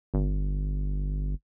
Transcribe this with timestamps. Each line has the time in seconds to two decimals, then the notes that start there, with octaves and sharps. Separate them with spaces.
0.14 G1